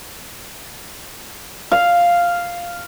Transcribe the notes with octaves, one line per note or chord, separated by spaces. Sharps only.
F5